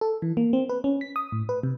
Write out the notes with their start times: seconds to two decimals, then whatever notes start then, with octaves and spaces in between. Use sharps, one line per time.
0.01 A4
0.22 E3
0.37 A#3
0.53 C4
0.69 B4
0.84 C#4
1.01 B6
1.16 D#6
1.32 A2
1.49 B4
1.63 C3